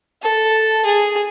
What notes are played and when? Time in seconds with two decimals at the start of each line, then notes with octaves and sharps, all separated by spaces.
0.22 A4
0.85 G#4